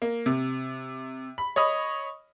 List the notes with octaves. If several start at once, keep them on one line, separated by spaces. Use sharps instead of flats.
A#3
C3
B5
C#5 D#5 B5 D#6